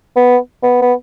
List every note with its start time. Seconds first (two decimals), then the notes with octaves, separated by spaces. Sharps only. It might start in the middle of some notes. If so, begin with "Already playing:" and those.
0.16 B3
0.63 B3
0.82 B3